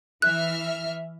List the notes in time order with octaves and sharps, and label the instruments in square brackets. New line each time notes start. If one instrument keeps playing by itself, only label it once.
[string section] E3 E5 F6 [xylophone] F#6